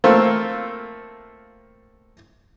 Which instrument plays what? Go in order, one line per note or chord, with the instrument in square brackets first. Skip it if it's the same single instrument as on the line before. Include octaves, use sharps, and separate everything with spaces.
[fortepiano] A3 A#3 C4 F4